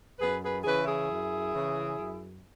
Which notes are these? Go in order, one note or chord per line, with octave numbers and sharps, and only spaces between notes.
F#2 G#4 B4
G#4 B4
C#3 E3 G#4 B4
E4 G#4
F#2
C#3 E3
F#2